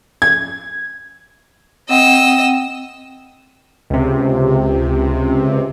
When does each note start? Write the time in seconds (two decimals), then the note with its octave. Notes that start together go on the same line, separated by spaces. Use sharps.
0.22 G#6
1.89 C4 D#5 F#5 G5 E6
3.90 C#2 C3